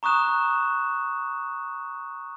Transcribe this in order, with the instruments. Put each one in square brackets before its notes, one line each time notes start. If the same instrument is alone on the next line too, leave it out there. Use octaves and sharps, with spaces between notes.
[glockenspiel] A#5 C#6 D#6 F#6 E7